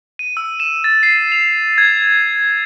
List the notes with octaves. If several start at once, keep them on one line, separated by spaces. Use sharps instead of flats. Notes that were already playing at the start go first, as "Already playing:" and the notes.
D#7
E6
E7
A6
C7
F7
G#6